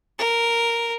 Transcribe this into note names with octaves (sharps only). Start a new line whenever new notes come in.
A#4